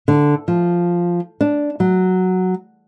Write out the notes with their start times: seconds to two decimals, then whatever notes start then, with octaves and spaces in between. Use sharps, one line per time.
0.08 D3
0.48 F3
1.41 D4
1.80 F#3